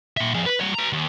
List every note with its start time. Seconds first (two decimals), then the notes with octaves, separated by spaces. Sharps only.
0.17 A#2 E5
0.35 F2 G#4
0.46 B4
0.60 G3 C#5
0.74 B4 A#5
0.93 D#2